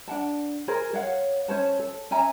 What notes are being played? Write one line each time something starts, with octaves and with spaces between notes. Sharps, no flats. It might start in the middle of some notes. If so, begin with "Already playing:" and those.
D4 F#5 A5
G#4 A#4 C5 A#5
C#5 F5 F#5
C#4 C5 C#5 A5
A4
C#4 E5 G#5 A#5